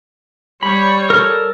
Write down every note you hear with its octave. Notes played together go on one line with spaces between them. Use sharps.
G3 C#5 B5
A4 A#4